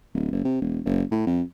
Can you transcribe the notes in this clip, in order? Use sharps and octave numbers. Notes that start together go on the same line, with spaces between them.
D1
F#1
C3
E1
F#1
A2
F2